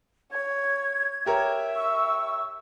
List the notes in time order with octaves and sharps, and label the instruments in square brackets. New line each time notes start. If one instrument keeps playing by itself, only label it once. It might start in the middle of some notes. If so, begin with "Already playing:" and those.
[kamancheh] C#5 [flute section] G#6
[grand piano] G4 A#4 C#5 [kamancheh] E5
[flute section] C#6 E6